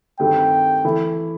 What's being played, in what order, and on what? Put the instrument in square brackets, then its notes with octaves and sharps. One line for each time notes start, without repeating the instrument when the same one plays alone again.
[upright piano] G2 D#3 A3 C4 [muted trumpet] G5
[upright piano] E3 A3 E4 A4